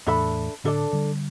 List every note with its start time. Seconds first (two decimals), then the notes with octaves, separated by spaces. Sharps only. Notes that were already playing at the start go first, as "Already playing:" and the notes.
0.07 E2 A2 D4 A4 E5 B5
0.64 A2 D3 D4 A4 D5
0.93 D3 G3